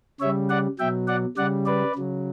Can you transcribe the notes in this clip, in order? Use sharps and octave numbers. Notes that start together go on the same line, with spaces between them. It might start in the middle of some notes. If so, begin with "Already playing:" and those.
C#3 G3 C#5 E5
D5 F#5
B2 F#3 E5 G5
D5 F#5
C#3 G3 D5 F#5
B4 D5
C#3 F#3